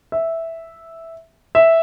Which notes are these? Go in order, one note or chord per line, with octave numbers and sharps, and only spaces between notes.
E5
E5